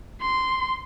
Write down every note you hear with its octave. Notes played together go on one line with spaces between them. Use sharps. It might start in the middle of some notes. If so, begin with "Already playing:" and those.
C6